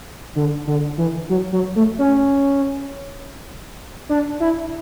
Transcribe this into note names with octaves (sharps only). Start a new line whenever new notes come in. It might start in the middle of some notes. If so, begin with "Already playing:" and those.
D3
D3
E3
F#3
F#3
A3
C#4
D4
E4